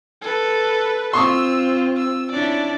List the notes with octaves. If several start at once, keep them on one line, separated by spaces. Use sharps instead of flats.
A4 B4
C4 F4 C6 C#6 D#6 E6
E6
C#4 D4 E4 D5